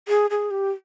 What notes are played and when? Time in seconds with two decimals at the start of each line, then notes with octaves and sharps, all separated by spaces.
0.08 G#4
0.30 G#4
0.51 G4